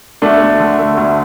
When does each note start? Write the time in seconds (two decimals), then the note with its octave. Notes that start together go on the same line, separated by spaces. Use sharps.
0.22 D2 A3 D4
0.41 D2
0.60 D3
0.79 A3
0.97 D2